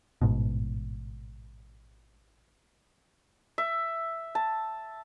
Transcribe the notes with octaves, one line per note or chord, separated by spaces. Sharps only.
A1 G#2 B2
E5
A5